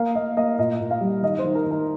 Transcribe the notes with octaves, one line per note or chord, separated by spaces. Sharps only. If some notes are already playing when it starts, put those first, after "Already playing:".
Already playing: A#3 F5
A#3 D#5
A#3 D#5
A#2 D#5
A#2
F5
G3
D#3 D#5
C5
D#3
A#4
D#3 A#4